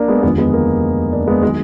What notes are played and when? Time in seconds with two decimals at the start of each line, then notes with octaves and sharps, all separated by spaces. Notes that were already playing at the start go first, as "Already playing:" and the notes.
Already playing: A#3 D4
0.08 G#3 B3
0.23 F1 D#2 D3 F3 G#3 B3
0.38 G#3 B3
0.53 A#3
1.12 A#3 D4
1.27 G#3 B3
1.43 D#3 F#3 G#3 B3